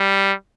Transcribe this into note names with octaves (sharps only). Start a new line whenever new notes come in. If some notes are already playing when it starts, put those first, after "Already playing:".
Already playing: G3